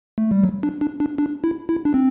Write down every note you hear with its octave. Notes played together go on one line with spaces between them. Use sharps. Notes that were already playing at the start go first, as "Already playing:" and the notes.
A3
G3
F#3
D4
D4
D4
D4
E4
E4
D4
C4